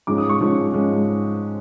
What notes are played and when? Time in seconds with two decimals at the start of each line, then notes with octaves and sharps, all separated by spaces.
0.07 G#2 F3 G#3 C#4 D6
0.18 D#6
0.29 C#6
0.41 G#2 F3 G#3 C#4
0.72 G#2 F3 G#3 C#4